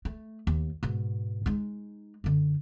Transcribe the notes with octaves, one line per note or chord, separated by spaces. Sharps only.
A3
D#2
G#2 B2
G#3 D#4
F#2 D3